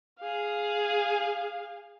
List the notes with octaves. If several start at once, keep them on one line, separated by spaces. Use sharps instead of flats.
G#4 F5